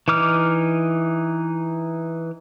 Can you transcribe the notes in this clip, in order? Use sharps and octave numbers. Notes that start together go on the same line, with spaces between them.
E3 D#4 D6 F6